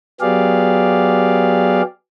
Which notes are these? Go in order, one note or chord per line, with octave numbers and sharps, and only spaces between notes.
F#3 B3 G4 G#4 D5 F5